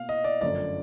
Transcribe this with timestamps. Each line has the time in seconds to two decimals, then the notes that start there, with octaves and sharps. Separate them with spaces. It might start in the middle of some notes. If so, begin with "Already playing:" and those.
Already playing: B2 A#3 F5
0.09 D#5
0.24 D5
0.41 G1 F#2 D3 F3 A3 D5